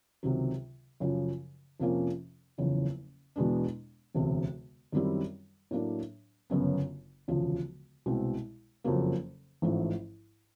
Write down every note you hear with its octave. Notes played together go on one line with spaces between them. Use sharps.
C#2 C3 D#3 F#3
F#2 C#3 F3
F2 C3 F3 A#3 C#4
F#1 E2 C#3 F3
E2 B2 G#3 B3 D4
E1 D2 C3
F#2 D#3 G3 C4 E4
A2 F#3 A#3 D4
G1 F#2 C#3 F#3 B3
E1 D2 C#3 F3
C2 B2 G#3 C4
F#1 F2 C#3 F#3 A#3
A1 G#2 F3 A3